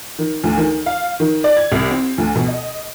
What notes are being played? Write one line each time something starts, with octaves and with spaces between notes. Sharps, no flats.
D#3
D2
D#3
F5
D#3
D5
G#6
C2
C4
D2
B2
D#5